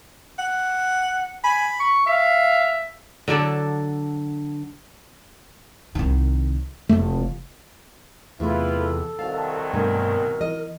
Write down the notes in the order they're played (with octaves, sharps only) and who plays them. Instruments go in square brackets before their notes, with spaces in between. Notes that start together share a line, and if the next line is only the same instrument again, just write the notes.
[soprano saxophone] F#5
[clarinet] G#5 [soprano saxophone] B5
[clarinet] C#6
[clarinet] E5 [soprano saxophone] F5
[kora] D3 F#3 D4 A4
[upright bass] C2 D#3
[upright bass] F1 E3 [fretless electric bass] A3
[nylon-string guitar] E2 C3 [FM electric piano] E3 A3 [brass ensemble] E4 F4 B4
[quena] A4
[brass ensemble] C2 D#3 F#3 [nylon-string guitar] F5 [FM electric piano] A5
[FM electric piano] G2 A3 G#5 [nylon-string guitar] B2 [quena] A#4
[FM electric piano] E3 [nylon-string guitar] D#5